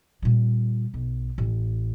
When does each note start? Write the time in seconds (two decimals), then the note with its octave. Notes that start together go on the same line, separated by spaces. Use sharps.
0.22 A#2 G3
0.94 B1
1.38 A1